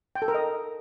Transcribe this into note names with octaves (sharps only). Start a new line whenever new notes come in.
G5
A4
A#4
D#5